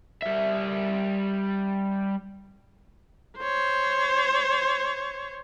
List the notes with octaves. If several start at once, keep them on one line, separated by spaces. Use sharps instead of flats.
G3 E5
C5 C#5